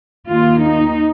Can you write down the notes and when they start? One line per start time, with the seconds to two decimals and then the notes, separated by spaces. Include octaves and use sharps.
0.28 D#2 D#3 A#3 F4
0.64 D#4